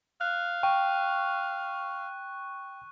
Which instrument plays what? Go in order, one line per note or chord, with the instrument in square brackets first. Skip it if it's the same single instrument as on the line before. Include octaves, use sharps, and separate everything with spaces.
[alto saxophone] F5 [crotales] F#6
[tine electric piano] G5 [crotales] C#6